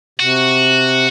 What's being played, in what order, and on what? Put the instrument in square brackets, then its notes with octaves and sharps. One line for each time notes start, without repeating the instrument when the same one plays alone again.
[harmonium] C3 [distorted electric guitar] F#4